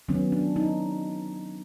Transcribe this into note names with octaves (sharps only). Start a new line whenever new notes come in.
D#3 F#3 B3 C#4
D4
D#4